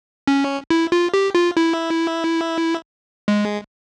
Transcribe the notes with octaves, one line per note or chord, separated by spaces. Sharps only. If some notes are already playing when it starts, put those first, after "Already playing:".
C#4
E4
F4
G4
F4
E4
G#3